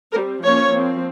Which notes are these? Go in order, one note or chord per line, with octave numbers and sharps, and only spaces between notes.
G3 C4 A#4
F3 A#3 C#4 C#5
F3 C4